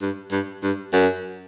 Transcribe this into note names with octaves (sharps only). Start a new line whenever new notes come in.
G2
G2
G2
F#2